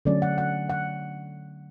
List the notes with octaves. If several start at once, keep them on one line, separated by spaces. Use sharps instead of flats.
D3 F#3 A3 C#4 D5
F#5
F#5
F#5